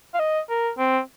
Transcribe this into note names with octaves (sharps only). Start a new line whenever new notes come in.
F5
D#5
A#4
C4